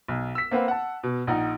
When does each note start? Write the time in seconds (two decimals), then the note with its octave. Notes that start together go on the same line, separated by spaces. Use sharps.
0.08 B1
0.35 E6 B6
0.51 A#3 C4 B4 F#5
0.68 F#5 A5
1.03 B2
1.27 A#1 D#4 F#5 A#5